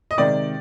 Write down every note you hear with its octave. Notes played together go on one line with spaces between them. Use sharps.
D#5
C3 D#3 G#3 D5